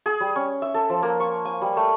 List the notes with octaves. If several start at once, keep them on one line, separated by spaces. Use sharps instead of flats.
G#4
G3
C#4
E5
A4
F3
A#3
C#6
G#5
G3
A3